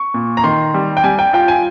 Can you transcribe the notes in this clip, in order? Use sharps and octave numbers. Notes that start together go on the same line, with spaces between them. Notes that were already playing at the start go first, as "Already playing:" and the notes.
Already playing: C#6
A#2
A#5
D#3 C6
G3
G5
G3 G#5
G5
F4 G5
G#5